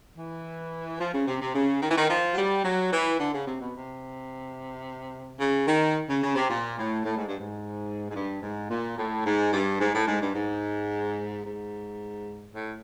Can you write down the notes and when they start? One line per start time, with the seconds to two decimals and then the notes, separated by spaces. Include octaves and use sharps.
0.18 E3
1.00 F3
1.14 C#3
1.28 C3
1.41 C3
1.55 C#3
1.82 D#3
1.91 E3
1.98 D#3
2.10 F3
2.33 F#3
2.38 G3
2.64 F#3
2.93 E3
3.20 D3
3.34 C#3
3.47 C3
3.61 B2
3.75 C3
5.40 C#3
5.68 D#3
6.09 C#3
6.23 C#3
6.36 C3
6.50 A#2
6.78 A2
7.04 A2
7.17 G#2
7.28 G2
7.40 G#2
8.10 G#2
8.15 G2
8.42 G#2
8.70 A#2
8.98 A2
9.26 G#2
9.53 G2
9.80 G#2
9.95 A2
10.07 G#2
10.22 G2
10.35 G#2
11.45 G#2
12.55 A2